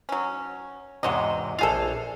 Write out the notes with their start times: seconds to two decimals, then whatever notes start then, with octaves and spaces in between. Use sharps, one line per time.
0.09 F#3 C#4
1.03 E2 G#2 C3 F#4 C#5 D#5
1.59 A#1 F4 G#4 A4 F5